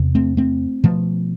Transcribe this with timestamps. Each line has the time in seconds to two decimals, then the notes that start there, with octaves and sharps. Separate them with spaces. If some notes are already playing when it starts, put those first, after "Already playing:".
Already playing: E2 C3
0.15 A3 C4
0.37 A3 C4
0.84 B2 F3 A3